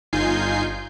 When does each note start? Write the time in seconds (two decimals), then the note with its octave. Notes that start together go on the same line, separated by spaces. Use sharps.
0.13 G1 D#4 F4 G#5 G6 C7